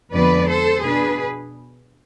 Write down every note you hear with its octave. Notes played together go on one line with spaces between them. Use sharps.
F2 D3 G#3 B3 B4 D5
A4 C5
B2 B3 D4 G#4 B4